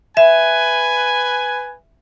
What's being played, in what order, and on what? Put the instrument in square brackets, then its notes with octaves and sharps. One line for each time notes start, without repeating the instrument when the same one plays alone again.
[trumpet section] B4 G#5 [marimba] E5